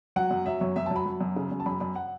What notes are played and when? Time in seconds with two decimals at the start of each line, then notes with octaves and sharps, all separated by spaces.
0.16 F#3 F#5
0.31 F#2
0.46 F#3 E5
0.61 F#2 C#5
0.76 F#2 E5
0.86 F#3 A5
0.96 B5
1.06 F#3
1.21 F#2
1.36 C#3
1.52 F#2
1.60 A5
1.66 F#2 B5
1.80 F#2 B5
1.96 F#5